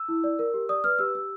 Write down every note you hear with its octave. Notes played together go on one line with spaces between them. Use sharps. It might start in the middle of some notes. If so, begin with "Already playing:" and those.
Already playing: E6
E4
D5
A#4
G4
D5 D#6
B4 F6
G4 E6
G4 E6